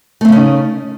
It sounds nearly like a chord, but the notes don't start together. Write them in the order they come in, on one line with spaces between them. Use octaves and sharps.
A3 C4 C#3 C#4 D#4